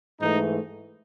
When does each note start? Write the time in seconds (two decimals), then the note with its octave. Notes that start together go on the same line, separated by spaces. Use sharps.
0.20 G#2 E3 A3 D#4